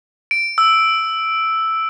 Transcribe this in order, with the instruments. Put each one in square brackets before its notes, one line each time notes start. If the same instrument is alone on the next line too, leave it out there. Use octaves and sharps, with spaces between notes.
[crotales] D7
E6